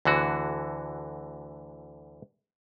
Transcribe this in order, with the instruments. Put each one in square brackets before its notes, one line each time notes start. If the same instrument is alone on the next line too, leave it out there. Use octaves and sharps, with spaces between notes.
[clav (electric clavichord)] D2 D3 E3 F#4